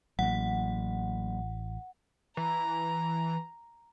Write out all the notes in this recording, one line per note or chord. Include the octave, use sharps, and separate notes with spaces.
A1 F#3 A#3 F#5
E3 A#5